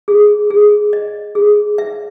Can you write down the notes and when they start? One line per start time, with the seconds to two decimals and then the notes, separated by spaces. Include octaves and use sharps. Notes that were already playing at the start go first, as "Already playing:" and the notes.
0.08 G#4
0.50 G#4
0.93 D#5
1.35 G#4
1.78 E5